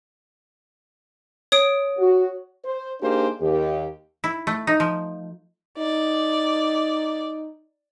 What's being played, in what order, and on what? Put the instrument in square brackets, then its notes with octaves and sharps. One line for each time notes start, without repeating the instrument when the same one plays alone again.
[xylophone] C#5 D#6 D7
[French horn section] F#4
C5
A#3 D4 D#4 G4 G#4 C5
D#2 G4
[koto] E4
A3
D#4
F3
[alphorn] D#4 [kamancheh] D5